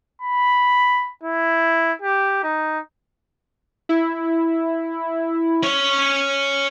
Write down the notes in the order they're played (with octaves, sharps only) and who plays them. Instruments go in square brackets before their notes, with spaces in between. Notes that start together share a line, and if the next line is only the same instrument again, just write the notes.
[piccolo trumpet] B5
E4
G4
D#4
[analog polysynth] E4
[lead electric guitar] C#4 C#5